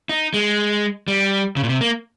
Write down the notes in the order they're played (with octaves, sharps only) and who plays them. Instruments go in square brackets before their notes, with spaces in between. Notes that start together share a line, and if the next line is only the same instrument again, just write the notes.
[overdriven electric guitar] D#4
G#3
G3
C#3
A#2
C3
A#3